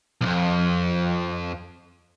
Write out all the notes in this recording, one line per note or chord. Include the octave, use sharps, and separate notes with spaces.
B1 F2